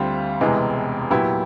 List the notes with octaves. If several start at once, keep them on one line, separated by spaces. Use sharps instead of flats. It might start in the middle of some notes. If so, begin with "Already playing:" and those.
Already playing: D2 D3 G3 C4 F4
E1 E2 C3 E3 G#3
A#2 F#3 B3 E4 G4